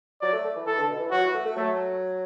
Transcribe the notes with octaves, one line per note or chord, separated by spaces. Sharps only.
F#3 D5
A3
A3
E3
E3 A4
D3
B2
E3
F#3 F#4
E3
A3
A3
F#3 A3